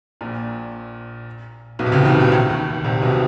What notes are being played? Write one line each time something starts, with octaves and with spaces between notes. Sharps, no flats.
A#1 A#2
B1 B2
C3
C#2 C#3
E3
D#2 D#3
C3
C#2 C#3
D#2 D#3
C2 C3
B1 B2